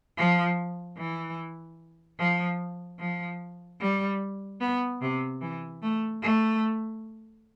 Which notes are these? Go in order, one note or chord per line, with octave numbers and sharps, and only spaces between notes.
F3
E3
F3
F3
G3
B3
C3
E3
A3
A3